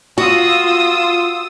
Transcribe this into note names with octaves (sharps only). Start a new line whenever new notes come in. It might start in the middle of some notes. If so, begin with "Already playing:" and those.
F4 F#4 D#6 E6